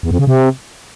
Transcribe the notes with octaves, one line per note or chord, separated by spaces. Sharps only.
E2
F2
C#3
C3